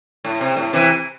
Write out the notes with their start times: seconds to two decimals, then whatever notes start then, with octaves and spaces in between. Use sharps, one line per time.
0.25 A2
0.41 C3
0.57 A2
0.73 C3 E3